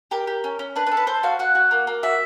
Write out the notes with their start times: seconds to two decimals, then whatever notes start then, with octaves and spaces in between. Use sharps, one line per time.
0.11 G4 A#4
0.27 G4
0.44 C#4
0.59 C#4
0.76 D4 B4
0.87 B4
0.92 A4
0.97 B4
1.07 A4 C5
1.23 F#4 F5
1.39 F#4 F#5
1.55 F#4
1.71 A#3
1.87 A#3
2.03 F#4 E5